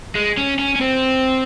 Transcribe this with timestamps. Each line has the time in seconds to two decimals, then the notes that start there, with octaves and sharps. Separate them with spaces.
0.15 G#3
0.37 C#4
0.59 C#4
0.76 C#4
0.81 C4